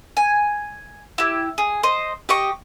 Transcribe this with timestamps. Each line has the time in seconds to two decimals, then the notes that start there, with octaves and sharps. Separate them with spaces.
0.17 G#5
1.18 E4 G4
1.58 G#4
1.83 C5 D#5
2.29 G4 D#5 C#6